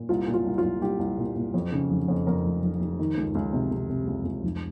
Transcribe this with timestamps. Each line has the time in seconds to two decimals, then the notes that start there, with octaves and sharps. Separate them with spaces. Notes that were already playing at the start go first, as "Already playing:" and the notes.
Already playing: A#2
0.09 C2 F4
0.27 A#2
0.34 F4
0.45 C2
0.58 F4
0.63 C2
0.81 C2 G4
0.99 C2
1.18 A#2
1.35 A#2
1.54 F2
1.72 C#3
1.90 F1
2.08 F2
2.27 F2 A#4
2.45 F1
2.63 F1
2.81 F1
2.99 D#3
3.17 C#2
3.35 C#2
3.53 C3
3.71 C3
3.90 C3
4.07 C#2
4.25 C#2
4.43 F1